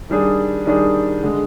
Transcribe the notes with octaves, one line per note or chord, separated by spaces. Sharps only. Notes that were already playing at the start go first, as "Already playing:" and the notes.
D#3 G3 D4 G#4
D#3 G3 D4 G#4
D3 G#3